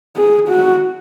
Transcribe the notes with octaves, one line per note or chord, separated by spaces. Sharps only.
G#4
F#4